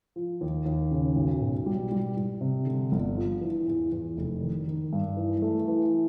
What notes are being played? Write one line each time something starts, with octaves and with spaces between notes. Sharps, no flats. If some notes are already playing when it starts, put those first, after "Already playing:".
F3
D#2
D#2
C#3
B1
B2
G3
G3
G3
C3
D3
G1
F3
E3
E2
E2
F1
D#3
D#3
G2
E3
A3
E3